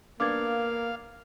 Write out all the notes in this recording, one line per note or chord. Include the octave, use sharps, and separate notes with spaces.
A#3 B3 D4 D5 F5 D6 G#6